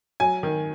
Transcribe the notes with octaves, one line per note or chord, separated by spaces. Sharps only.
F#3 G#5
D#3